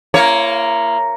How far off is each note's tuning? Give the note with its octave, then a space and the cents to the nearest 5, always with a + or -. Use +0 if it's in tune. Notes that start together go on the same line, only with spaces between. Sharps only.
A#3 +0 E4 +40 C#5 +5